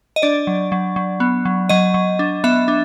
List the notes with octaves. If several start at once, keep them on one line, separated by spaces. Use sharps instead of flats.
D#5
D4 D5
F#3
F#3
F#3
B3
F#3
F#3 D#5
F#3
D4
B3 E5
D4